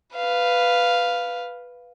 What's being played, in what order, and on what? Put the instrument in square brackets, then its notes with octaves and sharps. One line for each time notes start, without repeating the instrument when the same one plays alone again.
[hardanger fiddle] B4 F5